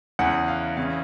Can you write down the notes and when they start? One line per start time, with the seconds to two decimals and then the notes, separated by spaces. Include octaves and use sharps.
0.19 E2 C#3 E3 F#5
0.48 F5
0.77 E2 C#3 E3 F5